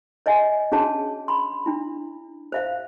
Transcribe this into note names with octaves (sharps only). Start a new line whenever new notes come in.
C#5 D#5 E5 G#5
C#4 D4 F#4 G#4 C#5 A5
B5 C6
D4 E4
C5 E5 F5